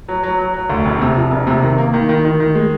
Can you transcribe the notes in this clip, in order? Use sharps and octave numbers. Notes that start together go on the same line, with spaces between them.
F#3
F#3
F#3
F#3
D2
E1
C3
F3
E1
C3
D#3
A#3
D#3
D#3
D#3
D#3
G#3